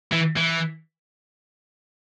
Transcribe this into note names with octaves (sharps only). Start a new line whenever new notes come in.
E3
E3